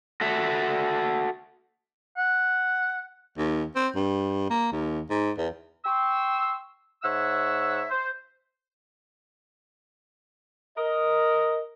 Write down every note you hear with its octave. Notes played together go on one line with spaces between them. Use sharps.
F#4 A4 E5
F#5
D#2
C4
G2
A#3
D#2
G#2
E2
G5 C6 C#6 E6
G#2 C#5 E5 F#5 E6
C5
A#4 D#5